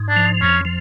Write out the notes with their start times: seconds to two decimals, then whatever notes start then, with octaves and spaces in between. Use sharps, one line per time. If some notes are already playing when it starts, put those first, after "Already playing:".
Already playing: G#2
0.09 D4
0.16 F3
0.41 F2 C#4
0.65 F3